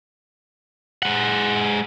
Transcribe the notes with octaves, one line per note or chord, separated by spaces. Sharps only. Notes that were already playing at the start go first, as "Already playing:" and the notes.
G#3 F#5